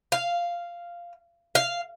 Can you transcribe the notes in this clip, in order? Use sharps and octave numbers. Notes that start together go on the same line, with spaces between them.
F5
F5